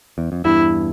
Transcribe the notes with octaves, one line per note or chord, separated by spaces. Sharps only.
E2
F2
E2 G2 E4